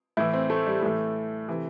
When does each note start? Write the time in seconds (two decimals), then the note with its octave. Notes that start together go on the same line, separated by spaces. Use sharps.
0.17 A2 E3 E4
0.33 C4
0.50 A3
0.66 G3
0.82 A2 E3 A3
1.48 C3 E3